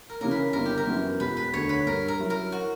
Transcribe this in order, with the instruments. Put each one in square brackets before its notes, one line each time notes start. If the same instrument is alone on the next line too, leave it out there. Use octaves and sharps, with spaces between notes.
[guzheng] A#4
[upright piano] C#3 E3 A#3 C#4 [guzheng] A#4
[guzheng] B4
[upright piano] G1 [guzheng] A#4
[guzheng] G4
A#4
[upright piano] F#2 E3 B3 F#4
[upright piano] E1 [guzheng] B4
[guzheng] B4
[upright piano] D2 D3 [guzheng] C#5
[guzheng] B4
[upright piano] G2 [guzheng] A#4
[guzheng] A#4
[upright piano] F#3 C#4 E4
[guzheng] A#4
F#4